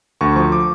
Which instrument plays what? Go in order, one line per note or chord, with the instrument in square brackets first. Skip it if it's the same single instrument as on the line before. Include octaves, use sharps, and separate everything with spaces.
[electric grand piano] D2 C#6
F3 C#6
D6